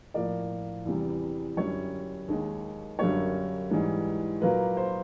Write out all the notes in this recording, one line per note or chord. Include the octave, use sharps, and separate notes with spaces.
A2 F3 A#3 D5
E2 C3 E3 G3
F#2 D3 G3 C#5
D#2 D#3 G#3
F#2 D3 G3 A#3 C#5
G#2 E3 G3
A#2 F#3 A#3 B4
C5